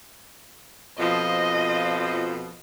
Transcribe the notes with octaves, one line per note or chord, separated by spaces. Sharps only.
F2 B2 F3 D#5